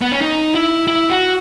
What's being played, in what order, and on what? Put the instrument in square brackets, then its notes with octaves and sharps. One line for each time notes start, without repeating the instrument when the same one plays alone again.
[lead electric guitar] B3
C#4
D#4
E4
E4
F#4